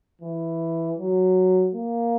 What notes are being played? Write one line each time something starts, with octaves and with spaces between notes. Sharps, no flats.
E3
F#3
A#3